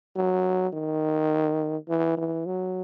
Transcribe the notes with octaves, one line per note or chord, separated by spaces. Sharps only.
F#3
D#3
E3
E3
F#3